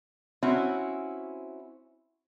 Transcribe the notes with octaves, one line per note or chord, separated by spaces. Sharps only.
C4 C#4 E4 F#4